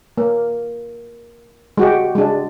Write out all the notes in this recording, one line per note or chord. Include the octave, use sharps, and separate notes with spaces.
A#3
G#3 F#4 G4
G#3 D4